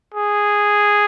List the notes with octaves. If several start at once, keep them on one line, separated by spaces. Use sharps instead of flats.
G#4